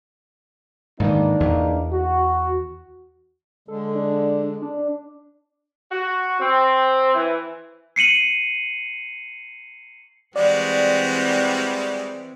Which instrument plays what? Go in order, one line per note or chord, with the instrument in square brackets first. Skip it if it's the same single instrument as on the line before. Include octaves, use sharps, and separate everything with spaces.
[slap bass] G#2 D#3 E3 [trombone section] A#3 D4 D#4
[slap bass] E2
[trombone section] F#4
[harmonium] D3 G#3 [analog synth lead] A4
[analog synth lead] D4
D4
[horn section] F#4
C4
E3
[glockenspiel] C7 C#7 D#7 F#7
[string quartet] E3 C4 [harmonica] G3 G#3 F#4 [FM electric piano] D5